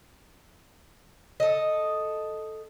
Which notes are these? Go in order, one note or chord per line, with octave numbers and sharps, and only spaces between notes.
A4 D#5